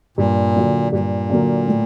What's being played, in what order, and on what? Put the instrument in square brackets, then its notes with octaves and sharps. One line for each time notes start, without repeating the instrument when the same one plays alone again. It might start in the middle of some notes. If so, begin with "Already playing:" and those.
[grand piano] G2 [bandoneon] A#2
[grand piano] D3 F#3 A#3
[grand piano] G2 [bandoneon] A#2
[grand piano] D3 F#3 A#3
A2